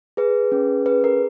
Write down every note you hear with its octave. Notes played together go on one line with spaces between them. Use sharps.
G#4 B4
C#4
G#4 B4
A#4